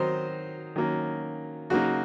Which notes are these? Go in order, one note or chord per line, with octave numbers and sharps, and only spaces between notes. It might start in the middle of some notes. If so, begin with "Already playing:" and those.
Already playing: D#3 F#3 C4 D#4 C5
D#3 F#3 A#3 C#4
C#3 F#3 A#3 D#4 F#4